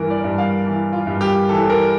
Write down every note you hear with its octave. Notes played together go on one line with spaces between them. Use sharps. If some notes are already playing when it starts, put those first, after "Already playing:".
Already playing: G2 E3 A#4
D5
G2
F5
E3
F4
G2
G4
E3 A4
A#4